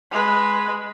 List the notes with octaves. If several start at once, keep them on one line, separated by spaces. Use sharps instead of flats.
G#3 B4